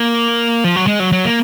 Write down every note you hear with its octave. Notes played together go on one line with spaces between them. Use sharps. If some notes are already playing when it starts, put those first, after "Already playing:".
Already playing: A#3
F3
F#3
G#3
F#3
F#3
A#3